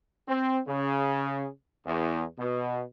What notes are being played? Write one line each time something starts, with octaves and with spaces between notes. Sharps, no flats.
C4
C#3
E2
B2